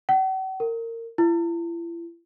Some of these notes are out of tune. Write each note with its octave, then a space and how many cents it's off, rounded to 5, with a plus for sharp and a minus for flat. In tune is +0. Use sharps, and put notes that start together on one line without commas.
F#5 +45
A#4 -25
E4 +40